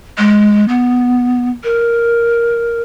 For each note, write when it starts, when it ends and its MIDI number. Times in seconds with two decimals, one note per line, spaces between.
0.18 0.65 56
0.68 1.50 59
1.64 2.82 70